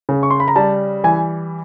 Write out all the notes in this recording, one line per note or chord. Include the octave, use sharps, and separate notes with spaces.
C#3
C#6
C6
B5
A#5
G3 A5
E3 G#5